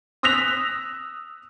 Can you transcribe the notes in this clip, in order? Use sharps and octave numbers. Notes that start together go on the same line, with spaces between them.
D#6 E6 F#6 A#6 B6 F7